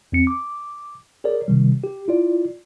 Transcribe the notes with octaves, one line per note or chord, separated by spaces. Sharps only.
E2 C4 C#7
D6
G#4 A#4 C#5 D5
C3 D#3 G3
G4
E4 F4 D5